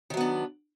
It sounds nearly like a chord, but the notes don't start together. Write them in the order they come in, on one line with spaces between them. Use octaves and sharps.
D#3 F#3 B3 D4